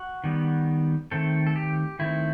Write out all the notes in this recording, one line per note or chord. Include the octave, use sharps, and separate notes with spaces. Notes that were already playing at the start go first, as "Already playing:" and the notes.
Already playing: F#4
D#3 G3 B3
D#3 A3 C4 A4
A4
G4
D#3 A3 C4 E4